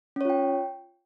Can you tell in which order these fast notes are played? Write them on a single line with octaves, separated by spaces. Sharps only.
C#4 C#5 F4 G5